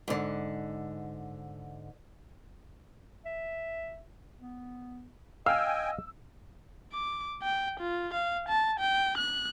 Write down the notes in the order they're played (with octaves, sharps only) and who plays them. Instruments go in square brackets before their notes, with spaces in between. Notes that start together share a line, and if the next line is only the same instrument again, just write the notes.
[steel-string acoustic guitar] G#2 D3
[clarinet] E5
B3
[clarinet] D#5 [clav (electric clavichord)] F5 [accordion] G5 G#5 [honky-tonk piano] E6
[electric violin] D6
G5
F4
F5
A5
G5
F#6